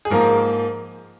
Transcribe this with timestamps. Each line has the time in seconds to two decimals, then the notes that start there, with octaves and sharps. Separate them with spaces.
0.05 G#4
0.10 G#2 F3 A#3 A#4